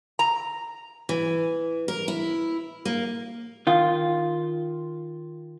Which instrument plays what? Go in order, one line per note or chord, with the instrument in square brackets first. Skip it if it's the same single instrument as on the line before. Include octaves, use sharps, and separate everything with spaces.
[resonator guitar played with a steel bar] A#5
[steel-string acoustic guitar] E3
A#4
E4
A#3
[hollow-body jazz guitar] D#3 F4